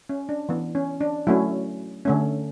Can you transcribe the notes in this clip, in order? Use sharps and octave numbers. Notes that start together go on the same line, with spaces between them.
C#4
D4
E3 B3
C#4
D4
F#3 A3 C#4 E4
D3 A3 C#4